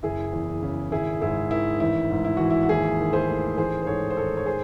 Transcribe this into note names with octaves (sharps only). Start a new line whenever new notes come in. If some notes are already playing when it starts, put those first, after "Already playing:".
F#1 E4 G#4
E2
C#3
G#1 E4 G#4
G#2 E4 G#4
D#3 E4
A1 E4
G#2
E4
E3 F#4
E4
F#4
D#2 E4 G#4
D#3
G#4 C5
A3
A1 G#4 C5
C5
G#2 A4 C#5
C5
D#3 A4 C#5
C#5
G#4 C5